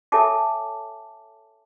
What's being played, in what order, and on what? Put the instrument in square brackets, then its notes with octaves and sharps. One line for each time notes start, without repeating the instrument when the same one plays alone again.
[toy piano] A4 C#5 E5 G#5 A5 D6